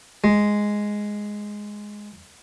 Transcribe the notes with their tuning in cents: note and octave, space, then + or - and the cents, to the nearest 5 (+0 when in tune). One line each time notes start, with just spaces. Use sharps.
G#3 +0